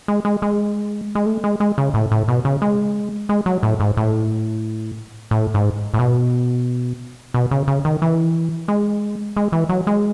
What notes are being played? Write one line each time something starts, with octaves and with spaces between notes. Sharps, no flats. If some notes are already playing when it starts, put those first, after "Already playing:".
G#3
G#3
G#3
G#3
A3
G#3
G#3
C#3
A2
A2
B2
C#3
G#3
G#3
F#3
A2
G#2
A2
A2
G#2
A2
B2
B2
C#3
C#3
D#3
E3
G#3
G#3
E3
F#3
G#3